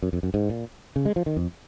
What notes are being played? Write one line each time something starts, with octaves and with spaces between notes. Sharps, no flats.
F#2
F2
F#2
G#2
A#2
C#3
G#3
F3
D#3
F2